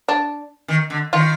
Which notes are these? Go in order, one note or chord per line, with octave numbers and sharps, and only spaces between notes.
D4
D#3
D3
D#3 F4